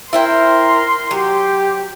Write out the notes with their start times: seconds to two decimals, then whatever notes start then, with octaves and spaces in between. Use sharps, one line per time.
0.13 E4 A#4 C5 G5 C6
1.11 F#3 G4